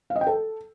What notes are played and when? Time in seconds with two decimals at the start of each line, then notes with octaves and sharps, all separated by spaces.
0.10 F5
0.16 D#5
0.21 G5
0.27 A4